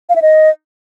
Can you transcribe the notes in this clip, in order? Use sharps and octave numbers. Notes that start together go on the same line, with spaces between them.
F5
E5
D#5